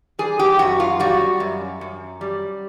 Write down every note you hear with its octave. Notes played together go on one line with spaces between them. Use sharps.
G3 G#4
G4
F#2 F#4
F4
G3 F#4
F#2
F#2
G3